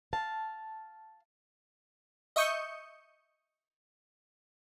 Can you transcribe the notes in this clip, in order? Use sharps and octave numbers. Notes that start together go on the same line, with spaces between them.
F5 A5
D#5 E5 C#6 D#6 G6 C#7